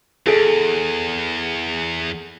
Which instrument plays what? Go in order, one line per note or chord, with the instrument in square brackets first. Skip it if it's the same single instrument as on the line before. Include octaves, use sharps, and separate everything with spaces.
[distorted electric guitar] E2 [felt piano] G#4 A4 D7